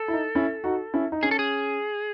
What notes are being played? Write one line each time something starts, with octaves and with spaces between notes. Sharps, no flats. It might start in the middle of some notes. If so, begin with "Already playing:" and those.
Already playing: A4
E4
D#4
C#4 E4
D#4 F#4
C#4 E4
D#4
C#4 G#4
A4
G#4